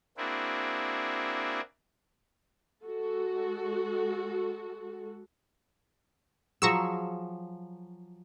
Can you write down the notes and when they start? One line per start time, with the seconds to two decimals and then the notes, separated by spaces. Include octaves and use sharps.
0.17 A#3 C4 D4 E4 F#4 G#4
2.84 G#3 F#4 A4
6.62 F3 F#3 G#4 A#5 C#6 E6